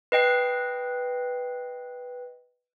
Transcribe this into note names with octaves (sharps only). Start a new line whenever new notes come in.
B4 D#5 G5 C7